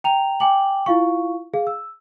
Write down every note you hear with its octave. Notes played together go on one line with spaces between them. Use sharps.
G5 A#5 F7
G5 G#5 D6 F#7
E4 F4 F5 C#6
G#4 F5
E6